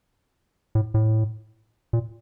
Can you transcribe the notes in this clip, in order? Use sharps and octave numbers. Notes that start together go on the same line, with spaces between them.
A2
A2
A#2